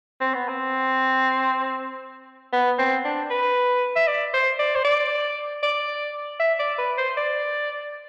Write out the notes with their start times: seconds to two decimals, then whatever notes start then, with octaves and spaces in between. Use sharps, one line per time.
0.21 C4
0.34 B3
0.49 C4
2.53 B3
2.79 C4
3.05 D4
3.30 B4
3.96 E5
4.08 D5
4.34 C5
4.59 D5
4.75 C5
4.85 D5
5.63 D5
6.40 E5
6.60 D5
6.78 B4
6.98 C5
7.17 D5